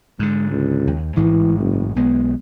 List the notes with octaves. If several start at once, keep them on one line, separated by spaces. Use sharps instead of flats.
G#2 D3 G#3
C#2
D#2
A1 G#2 E3 G#3
F#1
B1 G#3 B3